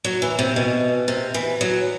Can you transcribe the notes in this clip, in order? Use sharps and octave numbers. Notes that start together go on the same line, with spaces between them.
F#3
E3
C3
B2
C3
E3
F#3